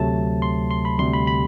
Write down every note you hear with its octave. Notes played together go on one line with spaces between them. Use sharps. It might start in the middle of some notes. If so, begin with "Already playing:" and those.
Already playing: D2 C3 F#3 A3 A5
C6
C6
B5
D2 C3 G3 C6
B5
B5